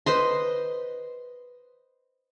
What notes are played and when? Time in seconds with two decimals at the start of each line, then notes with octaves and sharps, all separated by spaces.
0.06 B4 C5 D#5 C6